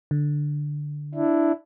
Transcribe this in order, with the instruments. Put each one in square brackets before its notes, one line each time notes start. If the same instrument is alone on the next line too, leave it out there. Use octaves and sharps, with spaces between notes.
[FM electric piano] D3
[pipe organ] D4 E4